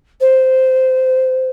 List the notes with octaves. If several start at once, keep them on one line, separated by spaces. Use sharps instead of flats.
C5